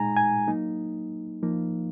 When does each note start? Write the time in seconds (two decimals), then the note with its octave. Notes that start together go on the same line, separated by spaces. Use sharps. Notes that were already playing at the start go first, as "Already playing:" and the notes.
Already playing: A#2 G#3 D#4 G#5 A#5
0.17 G#5
0.47 F#3 A#3 D#4
1.43 F3 A#3 D#4